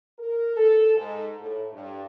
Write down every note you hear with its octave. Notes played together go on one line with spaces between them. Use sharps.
A#4
A4
G#2
A2
G2